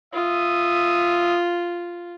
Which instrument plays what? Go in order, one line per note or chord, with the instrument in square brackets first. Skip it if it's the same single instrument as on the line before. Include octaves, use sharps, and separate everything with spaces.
[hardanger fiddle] F4 [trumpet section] E5 D#6